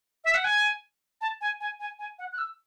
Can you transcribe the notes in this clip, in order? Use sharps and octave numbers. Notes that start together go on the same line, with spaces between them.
E5
F#5
G#5
A5
G#5
G#5
G#5
G#5
F#5
F#6
E6